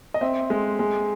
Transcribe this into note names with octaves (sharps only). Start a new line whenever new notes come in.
D#5
C4 E5
G#3
G#3